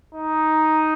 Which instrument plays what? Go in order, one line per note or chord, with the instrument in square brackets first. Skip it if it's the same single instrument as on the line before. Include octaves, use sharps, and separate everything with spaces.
[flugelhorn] D#4